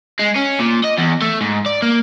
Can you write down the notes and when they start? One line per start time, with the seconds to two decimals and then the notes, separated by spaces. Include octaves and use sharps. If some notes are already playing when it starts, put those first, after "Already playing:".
0.19 G#3
0.35 C#4
0.59 A#2
0.84 D#5
0.98 E2
1.21 A3
1.41 G#2
1.66 D5
1.82 A#3